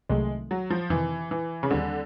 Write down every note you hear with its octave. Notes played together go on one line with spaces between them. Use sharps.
C2 C3 D#3 F#3 G#3 A3
F#3
F3
F2 C3 D#3 E3
E3
C#3
D#2 D3 D#3 G3 C4